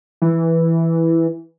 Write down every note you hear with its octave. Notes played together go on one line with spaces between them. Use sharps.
E3